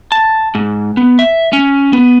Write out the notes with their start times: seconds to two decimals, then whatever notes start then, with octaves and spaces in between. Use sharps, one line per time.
0.12 A5
0.55 G#2
0.97 B3
1.19 E5
1.53 C#4
1.93 B3